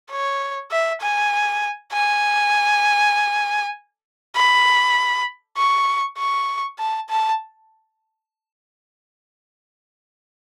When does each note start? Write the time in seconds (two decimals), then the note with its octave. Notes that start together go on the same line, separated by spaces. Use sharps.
0.11 C#5
0.71 E5
1.01 G#5
1.93 G#5
4.36 B5
5.58 C#6
6.18 C#6
6.79 A5
7.09 A5